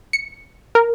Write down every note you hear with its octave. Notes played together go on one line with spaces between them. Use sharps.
C#7
A#4